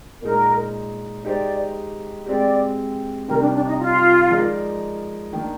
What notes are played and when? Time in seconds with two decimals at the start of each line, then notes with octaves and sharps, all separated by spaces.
0.22 A#2 G#3 D#4 A#4
1.24 G#3 D#4 G4 C5 D5
2.26 G#3 C4 G4 D5
3.28 C3 D#3 G3 A#4
3.41 D4
3.54 D4
3.67 D#4
3.80 F4
4.31 F3 G#3 D#4 A#4 D5
5.33 D#3 A#3 D4